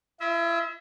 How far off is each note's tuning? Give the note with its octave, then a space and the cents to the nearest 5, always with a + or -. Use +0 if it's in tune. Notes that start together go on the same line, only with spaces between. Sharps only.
E4 +40 E5 -30